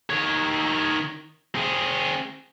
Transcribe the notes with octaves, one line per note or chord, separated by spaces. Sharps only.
D#3 C#5
C4 G#4